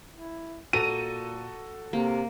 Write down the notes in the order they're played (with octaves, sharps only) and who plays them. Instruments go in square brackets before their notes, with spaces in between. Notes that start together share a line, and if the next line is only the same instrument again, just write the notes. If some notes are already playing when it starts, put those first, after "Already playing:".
[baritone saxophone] E4
[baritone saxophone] A#2 [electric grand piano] F#4 A4 [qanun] A#5 [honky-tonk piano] D#7
[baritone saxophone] C3 [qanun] A#3